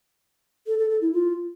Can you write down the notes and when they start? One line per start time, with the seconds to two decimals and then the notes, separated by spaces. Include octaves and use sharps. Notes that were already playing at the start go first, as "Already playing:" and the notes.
0.67 A4
0.79 A4
0.90 A4
1.02 E4
1.13 F4